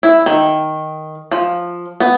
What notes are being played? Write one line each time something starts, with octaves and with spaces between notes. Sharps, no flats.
E4
D#3
F3
B3